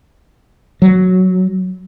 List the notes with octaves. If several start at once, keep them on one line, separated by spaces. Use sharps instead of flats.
F#3